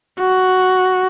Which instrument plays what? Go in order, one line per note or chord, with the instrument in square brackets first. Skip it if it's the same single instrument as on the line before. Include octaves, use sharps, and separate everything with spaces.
[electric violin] F#4